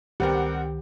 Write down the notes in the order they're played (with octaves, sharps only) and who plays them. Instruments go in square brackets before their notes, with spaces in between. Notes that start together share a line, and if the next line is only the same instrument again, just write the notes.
[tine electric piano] C#2 D#3 [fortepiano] G3 C4 A#4 [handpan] G4 [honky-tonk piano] F#5 G5